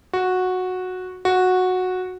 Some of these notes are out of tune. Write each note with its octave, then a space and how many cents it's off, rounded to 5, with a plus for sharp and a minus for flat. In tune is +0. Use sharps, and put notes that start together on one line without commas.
F#4 -10
F#4 -10